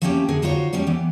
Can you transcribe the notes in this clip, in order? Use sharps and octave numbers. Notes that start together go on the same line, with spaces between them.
F3 A3 A#3 C4 C#4 G4
D3 G#4 A#4
D3 D#4 F4 F#4 C5 C#5
F3 G3 G#3 C#4 D5
E3 B3